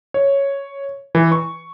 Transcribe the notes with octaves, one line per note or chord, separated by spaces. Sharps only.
C#5
E3
C#6